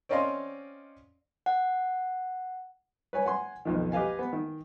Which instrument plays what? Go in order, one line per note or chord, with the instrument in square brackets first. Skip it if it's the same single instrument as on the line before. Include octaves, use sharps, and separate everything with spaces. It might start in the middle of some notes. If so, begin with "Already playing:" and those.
[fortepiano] C4 C#4 D5 D#5 F5 C6
[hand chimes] F#5
[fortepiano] B4 C#5 G#5
F#5 G#5 C6
B1 F2 D#3
G4 B4 D#5 F5 G#5
B3
D#3